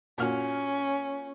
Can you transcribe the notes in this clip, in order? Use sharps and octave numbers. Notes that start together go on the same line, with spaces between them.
A#2 C#4 F#4 F6